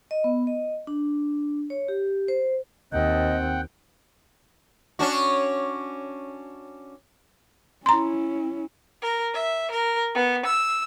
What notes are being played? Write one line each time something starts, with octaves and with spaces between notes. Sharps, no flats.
D#5
B3
D#5
D4
C#5
G4
C5
D#2 C4 D#5 F#5 G5
C#4 D4 F#4
C#4 E4 A#5 C6
A#4
E5
A#4
B3
E6